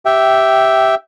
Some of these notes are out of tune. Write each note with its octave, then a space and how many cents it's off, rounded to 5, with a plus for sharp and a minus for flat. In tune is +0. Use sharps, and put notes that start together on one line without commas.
G4 -5 E5 +0 G5 -15